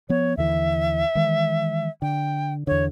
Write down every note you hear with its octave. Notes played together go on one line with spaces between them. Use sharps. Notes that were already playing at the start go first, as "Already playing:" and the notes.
F3 B3 C#5
D#2 D3 E3 E5
D#3 E3 G#3
D3 G5
E2 D3 C#5